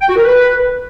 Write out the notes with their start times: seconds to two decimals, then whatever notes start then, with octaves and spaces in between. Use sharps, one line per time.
0.01 G5
0.09 F#4
0.17 A#4
0.24 B4